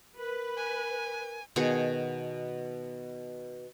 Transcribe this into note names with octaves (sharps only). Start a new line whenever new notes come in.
A#4 B4
G#5
B2 D#3 G#4 F#5